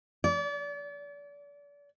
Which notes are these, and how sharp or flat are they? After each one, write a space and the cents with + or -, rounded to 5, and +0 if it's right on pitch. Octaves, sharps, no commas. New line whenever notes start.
D5 -35